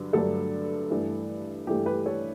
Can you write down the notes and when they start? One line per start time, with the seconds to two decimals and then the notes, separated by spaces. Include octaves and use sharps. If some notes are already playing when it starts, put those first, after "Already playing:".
Already playing: G2 D3 F#3
0.13 G2 D3 F#3 A3 A4
0.90 G2 E3 A3
1.67 G2 E3 A3 G4
1.86 G4 B4
2.06 A4 C#5